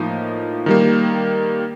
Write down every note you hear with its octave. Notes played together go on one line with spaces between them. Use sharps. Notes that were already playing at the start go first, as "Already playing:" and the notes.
Already playing: A2 F3 A#3 D#4
D#3 G3 A#3